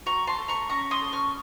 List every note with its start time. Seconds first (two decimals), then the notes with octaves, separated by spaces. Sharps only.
0.06 F#4 A#5 C#6
0.27 A5 C6
0.38 A3
0.48 A#5 C#6
0.69 C#4 A#5 C#6
0.91 C6 D#6
1.02 A4
1.13 C#6 F6